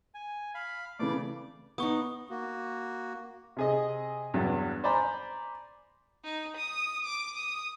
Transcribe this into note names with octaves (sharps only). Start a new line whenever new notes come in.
G#5
F5 B5
C#3 E3 A3 D5 D6
B3 D#4 C#6 D#6
A#3 F#4
C3 G#4 D#5
E2 G2 F#3
C5 D5 G#5 A#5 B5
D#4
D#6
D6
D#6